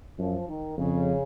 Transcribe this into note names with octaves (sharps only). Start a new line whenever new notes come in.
F#2 F3
D#3
F2 C#3